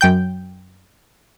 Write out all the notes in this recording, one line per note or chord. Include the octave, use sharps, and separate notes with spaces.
F#2 G5 G6